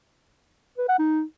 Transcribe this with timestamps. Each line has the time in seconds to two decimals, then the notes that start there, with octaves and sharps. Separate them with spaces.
0.78 B4
0.89 F#5
0.99 D#4